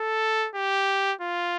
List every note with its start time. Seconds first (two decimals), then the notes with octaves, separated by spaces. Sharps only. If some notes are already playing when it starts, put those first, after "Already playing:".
Already playing: A4
0.55 G4
1.21 F4